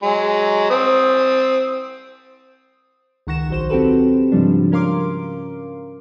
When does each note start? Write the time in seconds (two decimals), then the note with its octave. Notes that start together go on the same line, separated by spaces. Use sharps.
0.03 F#3 G#3
0.70 C4 D#6
3.27 C#2 D#3 F#5 C#6 A#6 E7
3.49 A#1 F#3 C5 E7
3.70 C4 F#4 G4 A4 B4
4.32 G#2 C#3 F3 G3 D4
4.72 C#4 A#4 F5 C6 D6